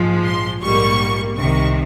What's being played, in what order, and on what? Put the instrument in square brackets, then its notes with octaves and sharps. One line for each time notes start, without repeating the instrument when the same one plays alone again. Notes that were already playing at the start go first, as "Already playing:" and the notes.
Already playing: [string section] A#1 G#2 F3 G#3
C6
A#1 G#2 G3 A#3 C#6
C2 C3 D#3 C#6